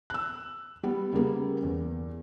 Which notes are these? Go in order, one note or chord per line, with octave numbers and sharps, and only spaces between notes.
E6 F#6
G3 B3
C#3 G3 A#3 B3
E2